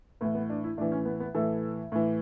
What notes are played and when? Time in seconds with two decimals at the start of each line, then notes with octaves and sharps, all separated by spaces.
0.21 A2 E3 B3
0.35 B3
0.50 D4
0.64 E4
0.77 A2 D4
0.81 E3
0.92 C#4
1.06 B3
1.20 B3
1.34 A2 E3 A4
1.92 A2 E3